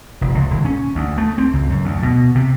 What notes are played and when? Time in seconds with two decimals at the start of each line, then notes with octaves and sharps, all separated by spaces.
0.21 F1
0.35 C#2
0.50 D#1
0.65 C#4
0.95 D2
1.18 A3
1.38 C4
1.54 C#2
1.70 F#2
1.84 D2
2.03 B2
2.35 C3